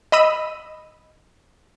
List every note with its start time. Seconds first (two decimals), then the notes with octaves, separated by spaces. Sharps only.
0.12 D#5 B5 E6 D#7